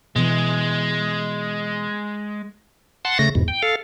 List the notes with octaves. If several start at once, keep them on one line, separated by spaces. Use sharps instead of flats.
B2 E3 G#3
F#5 A5 C6
C#3 A3 A#6
E2 G#2 B2
G5
A4 F5